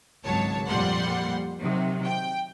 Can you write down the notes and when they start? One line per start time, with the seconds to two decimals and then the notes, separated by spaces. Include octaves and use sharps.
0.23 G#1 C#2 F#3 C#5 A5
0.67 F2 A#2 G3 F#5 C6
1.59 C3 D#3 F#3
2.04 G5